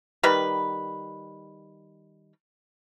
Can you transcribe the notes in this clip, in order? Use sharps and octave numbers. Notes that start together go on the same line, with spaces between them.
D#3 G3 B4